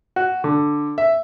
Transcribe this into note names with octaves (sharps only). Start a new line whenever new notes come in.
F#4
D3
E5